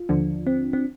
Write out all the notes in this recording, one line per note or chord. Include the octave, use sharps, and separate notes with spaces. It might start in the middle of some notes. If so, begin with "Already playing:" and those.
Already playing: F4
D#2 D3 F3 D4
C4
C4